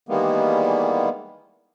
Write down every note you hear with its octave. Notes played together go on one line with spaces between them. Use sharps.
D#3 E3 G3 G#3 A#3 B3